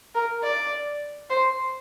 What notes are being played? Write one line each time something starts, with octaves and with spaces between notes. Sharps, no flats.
A#4
D5
C5